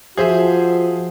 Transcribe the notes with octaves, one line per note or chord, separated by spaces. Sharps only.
F3 F#4 G#4 C5 E5